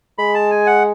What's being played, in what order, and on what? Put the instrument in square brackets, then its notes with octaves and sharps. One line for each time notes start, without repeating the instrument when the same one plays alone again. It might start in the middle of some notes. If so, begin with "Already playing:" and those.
[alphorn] G#3 [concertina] B5
[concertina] A5
G#5
F#5